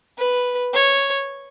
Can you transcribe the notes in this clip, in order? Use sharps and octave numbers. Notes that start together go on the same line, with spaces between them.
B4
C#5